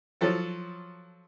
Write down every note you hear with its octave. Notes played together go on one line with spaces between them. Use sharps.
F3 F#3 A4